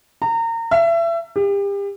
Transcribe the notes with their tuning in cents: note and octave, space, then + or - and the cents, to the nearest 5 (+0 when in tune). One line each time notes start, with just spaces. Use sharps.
A#5 -30
E5 +30
G4 +35